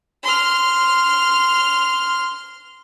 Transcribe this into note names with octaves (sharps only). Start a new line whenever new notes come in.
C6 F6